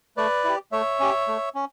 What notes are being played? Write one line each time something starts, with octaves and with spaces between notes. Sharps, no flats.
A3 B4 D5
E4 G4
A3 C#5 E5
C#4 G4
A3
C#4